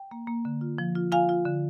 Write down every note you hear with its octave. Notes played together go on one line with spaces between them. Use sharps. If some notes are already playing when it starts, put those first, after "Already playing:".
Already playing: G5
A#3
A#3
D3
F4
F3
F4
F4 F5 G#5
F4
D3